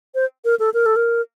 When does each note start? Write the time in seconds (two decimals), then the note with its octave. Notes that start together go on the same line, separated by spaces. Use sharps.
0.15 C5
0.45 A#4
0.59 A4
0.74 A#4
0.86 A4
0.96 A#4